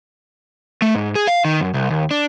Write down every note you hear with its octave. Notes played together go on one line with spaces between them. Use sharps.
A3
G#2
G#4
F5
D#3
F#2
C2
D#2
D4